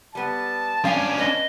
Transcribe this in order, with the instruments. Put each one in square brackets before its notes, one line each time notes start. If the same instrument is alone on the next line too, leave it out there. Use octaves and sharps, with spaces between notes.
[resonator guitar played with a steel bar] G3 B3 [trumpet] A5
[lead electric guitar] C#4 D4 [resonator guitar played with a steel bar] F5 G5 [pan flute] G#5
[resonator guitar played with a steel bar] B4 [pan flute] D#5